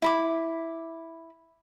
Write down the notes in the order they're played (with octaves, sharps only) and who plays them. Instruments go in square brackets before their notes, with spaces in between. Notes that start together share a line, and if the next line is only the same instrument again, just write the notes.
[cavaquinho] E4 B5 D6